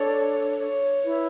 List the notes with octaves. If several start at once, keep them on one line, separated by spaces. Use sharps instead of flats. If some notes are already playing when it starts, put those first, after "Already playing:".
Already playing: D4 A4 C#5 D5
C#5
E4 B4